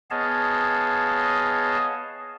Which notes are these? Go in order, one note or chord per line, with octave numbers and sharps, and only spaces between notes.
B3 G#4 C#5 D#5 F5 A5